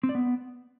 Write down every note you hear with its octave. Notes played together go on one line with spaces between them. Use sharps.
C4
D5
B3